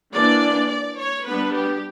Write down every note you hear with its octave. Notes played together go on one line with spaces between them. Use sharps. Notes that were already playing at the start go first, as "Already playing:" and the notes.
E3 A#3 D4 D5
D5
C#5
G3 B3 D4 B4
G4